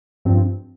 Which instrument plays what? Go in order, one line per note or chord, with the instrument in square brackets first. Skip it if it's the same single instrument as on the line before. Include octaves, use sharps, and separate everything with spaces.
[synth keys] G2 F3 C4